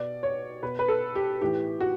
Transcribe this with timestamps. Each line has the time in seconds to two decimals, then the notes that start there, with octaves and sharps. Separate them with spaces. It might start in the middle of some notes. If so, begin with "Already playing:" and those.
Already playing: B2 D5
0.23 C#5
0.62 B2 B4
0.79 B4
0.88 A4
1.15 G4
1.41 A2 E3 G4
1.80 F#4